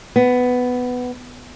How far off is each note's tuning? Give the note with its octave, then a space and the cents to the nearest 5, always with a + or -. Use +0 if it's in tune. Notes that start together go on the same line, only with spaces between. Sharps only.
B3 +10